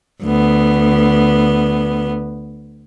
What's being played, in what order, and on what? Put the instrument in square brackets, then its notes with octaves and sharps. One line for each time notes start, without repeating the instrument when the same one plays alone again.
[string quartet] D2 B3